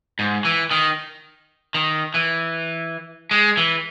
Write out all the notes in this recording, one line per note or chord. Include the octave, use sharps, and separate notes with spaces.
G#2
E3
D#3
D#3
E3
G#3
E3